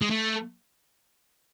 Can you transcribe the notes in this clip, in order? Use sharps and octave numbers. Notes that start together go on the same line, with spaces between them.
G#3
A3